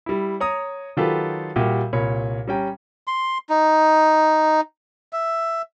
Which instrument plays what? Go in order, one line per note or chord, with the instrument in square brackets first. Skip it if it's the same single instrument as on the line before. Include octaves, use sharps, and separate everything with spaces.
[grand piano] G3 E4
C#5 A#5 D#6
D#3 F#3 F4 G4 A4 B4
A#2 G3 F#4 G4 E5
C2 A#2 C#5 B5
G3 C#4 G5 A#5
[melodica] C6
D#4
E5